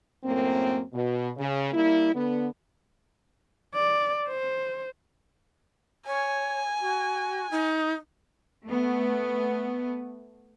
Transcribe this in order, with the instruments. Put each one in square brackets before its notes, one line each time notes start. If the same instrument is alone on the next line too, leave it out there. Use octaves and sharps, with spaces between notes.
[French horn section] F#2 A2 A#3 C4
B2
C#3
G3 A#3 E4
D3 B3
[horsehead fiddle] D5
C5
[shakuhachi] C#5 [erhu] G#5
[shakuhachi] F#4
D#4
[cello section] A3 B3